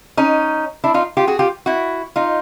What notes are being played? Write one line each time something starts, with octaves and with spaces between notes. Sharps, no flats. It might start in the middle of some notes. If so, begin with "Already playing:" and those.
C#4 D#4
D4 E4
D#4 F4
F4 G4
F#4 G#4
F4 G4
E4 F#4
D#4 F4